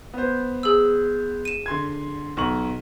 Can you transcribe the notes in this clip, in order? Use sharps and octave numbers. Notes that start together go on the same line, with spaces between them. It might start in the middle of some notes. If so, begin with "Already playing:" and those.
B3 C5
G#4 E6
D#7 E7
D3 C6 G#6
B1 C#6 F#7